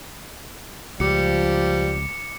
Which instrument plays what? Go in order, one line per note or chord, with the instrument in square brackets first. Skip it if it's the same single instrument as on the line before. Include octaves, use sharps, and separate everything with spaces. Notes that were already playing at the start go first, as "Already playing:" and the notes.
[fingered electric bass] C#2 [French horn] F3 [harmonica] G3 [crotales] D6 C#7